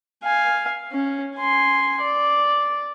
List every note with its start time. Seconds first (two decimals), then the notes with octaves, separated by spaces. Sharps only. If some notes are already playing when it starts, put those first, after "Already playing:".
0.23 F5 G#5
0.91 C#4
1.36 G#5 C6
2.01 D5